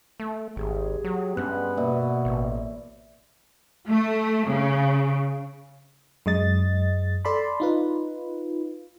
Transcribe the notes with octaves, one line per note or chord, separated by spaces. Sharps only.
A3
G#1 G4 G#4
F#3
G2 G#3 B3 C#4 F#6
B2 A#3 D5 E5
A1
A3
C#3
F#2 G#3 D#5 A6
A4 D5 A5 B5 C6
D#4 F4 B4